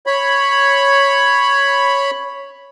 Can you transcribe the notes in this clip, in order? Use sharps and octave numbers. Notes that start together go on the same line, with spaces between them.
C#5 B5